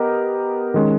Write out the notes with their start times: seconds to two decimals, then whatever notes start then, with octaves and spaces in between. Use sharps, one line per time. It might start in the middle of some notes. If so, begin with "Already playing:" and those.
Already playing: B3 G4 A#4 D#5
0.74 D#3 G#3 C#4